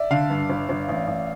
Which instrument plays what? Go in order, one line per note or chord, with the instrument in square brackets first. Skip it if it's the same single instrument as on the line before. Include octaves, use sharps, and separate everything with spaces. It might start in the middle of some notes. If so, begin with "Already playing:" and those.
Already playing: [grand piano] D5 E5
[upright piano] D3 [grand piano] F5
[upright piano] G2
G1
G1
A1
A1